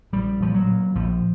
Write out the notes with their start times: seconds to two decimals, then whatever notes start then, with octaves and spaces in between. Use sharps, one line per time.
0.13 A#1 G3
0.40 A#2 F3
0.55 F#3
0.67 A#2
0.95 A#1 F3